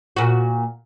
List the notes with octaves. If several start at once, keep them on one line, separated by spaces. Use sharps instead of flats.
A#2 F#4